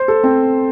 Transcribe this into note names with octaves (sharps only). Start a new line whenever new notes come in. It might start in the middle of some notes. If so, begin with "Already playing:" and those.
Already playing: C5
A4
C4